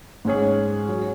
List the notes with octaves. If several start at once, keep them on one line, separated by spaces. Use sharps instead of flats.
G#2 G#3 C#4 G#4
F#3 C#4 G#4